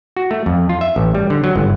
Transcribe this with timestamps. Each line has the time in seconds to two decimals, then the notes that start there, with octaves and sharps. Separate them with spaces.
0.17 F#4
0.31 A3
0.46 F2
0.69 F4
0.81 E5
0.96 A1
1.15 G3
1.30 D3
1.44 F#3
1.56 G1